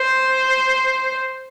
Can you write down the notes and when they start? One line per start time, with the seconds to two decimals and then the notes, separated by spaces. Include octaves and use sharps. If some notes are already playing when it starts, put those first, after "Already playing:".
Already playing: C5